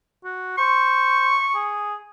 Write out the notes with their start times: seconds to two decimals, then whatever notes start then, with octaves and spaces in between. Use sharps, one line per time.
0.24 F#4
0.58 C5 C#6
1.55 G#4